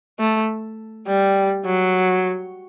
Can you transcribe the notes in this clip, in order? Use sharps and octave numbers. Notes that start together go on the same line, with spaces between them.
A3
G3
F#3